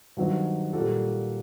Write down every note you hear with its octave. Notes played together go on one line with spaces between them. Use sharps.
G2 D#3 F#3 C4 D#4
A#2 G3 A#3 F#4 A4